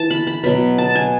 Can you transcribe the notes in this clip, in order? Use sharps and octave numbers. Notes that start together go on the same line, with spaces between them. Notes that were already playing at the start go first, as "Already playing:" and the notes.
Already playing: E3 A5
B5
B5
B2 F#3 B3 B5
A5
G#5